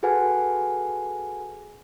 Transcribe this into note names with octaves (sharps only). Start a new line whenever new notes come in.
F#4 G#4 A4 B4 F#5 G#5